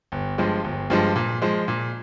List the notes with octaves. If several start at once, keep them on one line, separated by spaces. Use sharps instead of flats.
G1
G2 F3 G#3
G1
G2 F3 G#3
A#2
F3 G#3
A#2